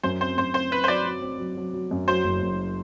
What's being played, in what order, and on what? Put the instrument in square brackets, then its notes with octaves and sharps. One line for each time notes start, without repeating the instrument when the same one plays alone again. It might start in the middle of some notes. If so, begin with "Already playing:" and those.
[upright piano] F#2 [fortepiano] C5
[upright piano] C4 [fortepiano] C5
[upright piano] F#2 [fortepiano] C5
[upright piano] C4 [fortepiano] C5
[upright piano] C4 [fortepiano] B4
[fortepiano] C5
[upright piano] F#3 [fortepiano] D5
[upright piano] F#3
C4
F#3
F#3
F#3
F#2
[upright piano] F#3 [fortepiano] C5
[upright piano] F#1
F#1